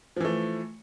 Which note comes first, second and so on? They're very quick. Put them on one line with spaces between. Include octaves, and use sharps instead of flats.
F3 E3 A3